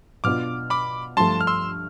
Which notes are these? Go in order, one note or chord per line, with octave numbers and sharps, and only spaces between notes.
B2 B3 D4 F4 D6 F6
B5 D6
G2 F3 A3 A5 C6
F6
C6 E6